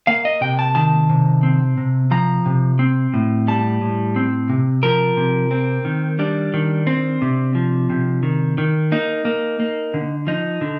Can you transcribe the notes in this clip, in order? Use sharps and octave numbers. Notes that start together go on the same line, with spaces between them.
A#3 F5
D#5
C3 G5
A5
D#3 A5
C3
C4
C3
F3 A#5
C3
C4
A2
G3 A5
A2
C4
C3
F3 A#4
C3
C4
D#3
G3 D4
D#3
C4
C3
F3
C3
D#3
D#3
A#3 D#4
A#3
A#3
D3
F3 D#4
D3